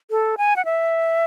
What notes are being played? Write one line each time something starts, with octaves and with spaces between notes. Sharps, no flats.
A4
G#5
F#5
E5